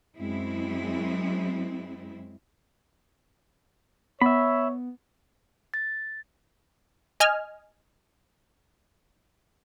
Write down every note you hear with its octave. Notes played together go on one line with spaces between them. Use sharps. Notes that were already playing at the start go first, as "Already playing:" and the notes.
F#2 G#3 C4 E4
B3 C#5 E5 B5
A6
D#5 G#5 F6